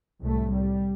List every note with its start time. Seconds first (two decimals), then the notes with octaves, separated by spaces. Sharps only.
0.21 C2 A2 A3
0.53 G3